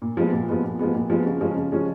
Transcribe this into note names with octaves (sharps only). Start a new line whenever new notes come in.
A#2
F3 G#3 B3
A#2
F3 G#3 B3
A#2
F3 G#3 B3
A#2
F3 G#3 B3
C#3
F3 G#3 C#4
C#3
F3 G#3 C#4